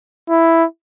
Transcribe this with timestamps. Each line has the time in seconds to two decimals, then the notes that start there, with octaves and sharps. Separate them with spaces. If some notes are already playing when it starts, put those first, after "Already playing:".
0.29 E4